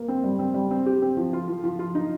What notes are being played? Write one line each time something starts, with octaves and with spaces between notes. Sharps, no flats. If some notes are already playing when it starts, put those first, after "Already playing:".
Already playing: A#3
C4
G3
C4
G3
C4
G4
C4
F3
F4
F3
F3
F4
D#4